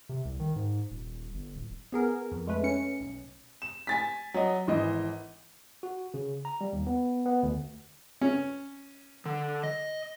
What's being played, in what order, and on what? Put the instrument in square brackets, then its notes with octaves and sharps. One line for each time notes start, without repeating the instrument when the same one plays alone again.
[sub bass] C3
C2
D#3
G#2
D#1
G1
D1
[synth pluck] B3 G#4 A#4
F2
G#3 A3 B4
C#4 C#7
B1
[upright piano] E7
G#5 A6 B6
F#3 D#5
G#1 E3 D#5
[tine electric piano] F#4
C#3
A#5
G3
D#2
B3
B3
D2
[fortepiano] C#4
[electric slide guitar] D3
D#5